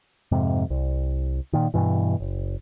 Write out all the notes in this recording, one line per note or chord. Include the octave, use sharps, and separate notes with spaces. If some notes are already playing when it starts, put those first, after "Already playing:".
F2 G#2 C3
C2
A#2 D#3
G2 B2 E3
F#1